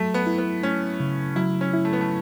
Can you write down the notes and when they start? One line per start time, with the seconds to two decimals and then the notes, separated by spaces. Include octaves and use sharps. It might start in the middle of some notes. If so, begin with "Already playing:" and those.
Already playing: F#3 A3
0.14 B3
0.26 E4
0.38 B3
0.63 A3 C#4
1.00 C#3
1.36 F#3 E4
1.61 C#4
1.73 E4
1.85 A3
1.93 B3
2.01 A3